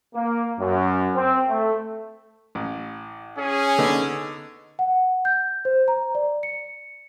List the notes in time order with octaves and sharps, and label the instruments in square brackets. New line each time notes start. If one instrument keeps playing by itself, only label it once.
[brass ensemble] A#3
F#2
C4
A3
[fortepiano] A1
[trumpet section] C#4 G#4
[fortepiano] D3 B3 D#4
[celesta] F#5
G6
C5
A#5
D5
C#7